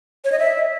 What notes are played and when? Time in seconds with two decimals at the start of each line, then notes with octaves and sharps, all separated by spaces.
0.25 C#5
0.32 D#5
0.39 E5